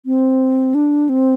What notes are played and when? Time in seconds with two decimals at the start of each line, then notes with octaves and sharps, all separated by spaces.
0.06 C4
0.75 D4
1.09 C4